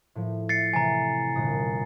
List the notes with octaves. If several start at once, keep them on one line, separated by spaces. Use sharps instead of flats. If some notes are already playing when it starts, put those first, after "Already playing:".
A2 F3
E5 A6 C7 C#7
C3 E3 A3 G#5 A#5
G1 A#2 D#6